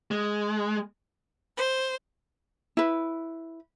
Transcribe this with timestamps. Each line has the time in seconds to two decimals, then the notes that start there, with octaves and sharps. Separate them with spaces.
0.11 G#3
1.56 C5
2.77 E4 B4